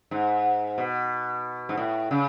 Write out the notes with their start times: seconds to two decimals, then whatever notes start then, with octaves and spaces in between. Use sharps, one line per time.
0.11 G#2
0.78 B2
1.69 G#2
1.77 A2
2.11 C#3